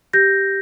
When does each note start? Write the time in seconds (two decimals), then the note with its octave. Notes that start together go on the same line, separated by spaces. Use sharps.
0.13 G4 G6 A#6